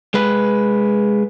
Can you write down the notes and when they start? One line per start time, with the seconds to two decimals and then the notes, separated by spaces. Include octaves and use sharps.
0.14 G#3 B4